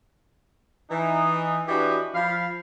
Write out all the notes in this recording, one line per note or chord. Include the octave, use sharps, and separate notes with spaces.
E3 D#4
E3 D4 F#4 G4 B4 D#5
F3 F5 B5